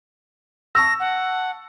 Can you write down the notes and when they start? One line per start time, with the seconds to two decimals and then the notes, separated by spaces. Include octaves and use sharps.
0.75 A5 C#6 E6 A#6
1.00 F#5